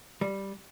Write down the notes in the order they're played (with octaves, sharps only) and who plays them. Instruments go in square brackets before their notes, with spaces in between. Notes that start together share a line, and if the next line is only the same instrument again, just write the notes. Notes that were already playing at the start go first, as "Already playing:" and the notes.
[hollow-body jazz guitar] G3